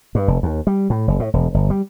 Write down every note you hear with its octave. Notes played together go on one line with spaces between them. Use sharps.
G2
F1
D#2
G3
A2
F#1
A2
E1
G1
G3